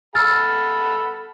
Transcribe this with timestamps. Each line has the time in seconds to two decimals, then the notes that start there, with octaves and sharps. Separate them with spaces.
0.15 A4 F#5 B5 E6 F6 A6